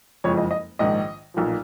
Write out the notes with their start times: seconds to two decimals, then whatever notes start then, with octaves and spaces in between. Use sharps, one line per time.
0.24 F#1 F2 F3 G#3 C#5
0.37 D#5
0.51 D#5
0.79 A#1 G#2 D#3 D#5
1.34 B1 A#2 F3